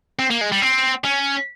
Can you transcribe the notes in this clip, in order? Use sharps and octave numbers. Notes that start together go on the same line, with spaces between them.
C4
A#3
G#3
G3
C4
C#4